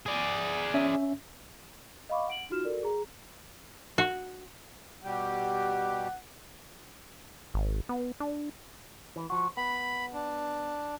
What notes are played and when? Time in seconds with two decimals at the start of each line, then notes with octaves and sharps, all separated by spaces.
0.06 G#4 D5
0.74 C#4 E5
2.09 D#5 F5 B5 C#6 D6
2.28 F#5 D7 F#7
2.50 D#4 F4 F#4 F6 E7
2.65 F#4 A4 A#4 D5
2.83 G#4 A#5
3.98 F#4
5.04 B2 G3 G4 F#5
7.54 G#1
7.89 B3
8.20 D4
9.16 E3
9.30 F3 F#4
9.57 B3 B5
10.13 D4